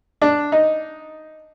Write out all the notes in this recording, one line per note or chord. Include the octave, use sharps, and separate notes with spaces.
D4
D#4